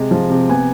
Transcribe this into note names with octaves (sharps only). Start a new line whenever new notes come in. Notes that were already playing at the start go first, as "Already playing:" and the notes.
Already playing: C3 G#3
F3
C3
B3 G#5